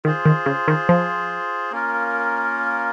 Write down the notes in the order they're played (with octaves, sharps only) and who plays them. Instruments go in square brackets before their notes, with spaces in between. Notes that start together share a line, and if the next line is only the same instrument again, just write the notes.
[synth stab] D#3 [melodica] F4 G#4 C5
[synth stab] D#3
C#3
D#3
F3
[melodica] A#3 C#4 F4 A#4